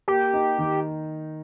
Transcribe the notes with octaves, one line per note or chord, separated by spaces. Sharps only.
A#3 G4
D#4
D#3